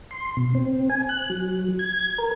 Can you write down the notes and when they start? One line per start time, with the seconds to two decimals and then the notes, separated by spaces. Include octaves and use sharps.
0.11 C6
0.37 B2
0.55 C4
0.90 G#5
1.09 F#6
1.30 F#3
1.79 G#6
2.18 A#4